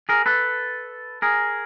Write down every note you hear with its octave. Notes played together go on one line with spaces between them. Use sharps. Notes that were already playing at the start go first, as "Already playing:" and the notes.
G#4 A#4
A4 B4
G#4 A#4